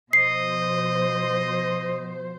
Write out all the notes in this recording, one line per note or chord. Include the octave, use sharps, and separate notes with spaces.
B2 F3 C5 D#5 C7